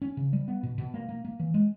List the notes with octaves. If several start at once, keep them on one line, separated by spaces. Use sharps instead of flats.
C#4
C#3
G3
B3
B2
B2
A#3
A#3
A#3
E3
G#3